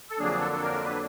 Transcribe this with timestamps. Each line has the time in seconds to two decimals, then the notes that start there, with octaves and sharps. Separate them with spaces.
0.10 A4
0.19 F2 D3 F#3 A#3 D4 G#4
0.41 A4
0.52 A4
0.62 A#4
0.84 B4